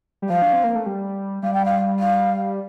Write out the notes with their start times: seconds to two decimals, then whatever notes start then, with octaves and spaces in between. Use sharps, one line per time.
0.22 G3
0.29 F3 F5
0.42 D4
0.53 C4
0.64 A#3
0.75 A3
0.86 G3
1.43 G3 F5
1.54 G5
1.65 F5
1.99 F5